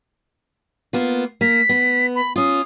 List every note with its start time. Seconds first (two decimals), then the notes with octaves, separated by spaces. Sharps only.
0.93 A#3 B3 F4
1.41 A#3 B6
1.69 B3
2.15 B5
2.36 C#4 F4 D#6